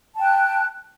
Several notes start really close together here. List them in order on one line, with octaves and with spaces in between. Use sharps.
A5 G5 F#6